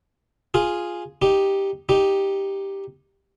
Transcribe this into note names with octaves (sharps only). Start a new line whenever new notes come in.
F4 G#4
D#4 G4
D#4 G4